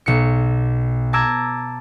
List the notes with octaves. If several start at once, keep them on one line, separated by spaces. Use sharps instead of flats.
B1 C#7
A5 A#5 D6 E6 G#6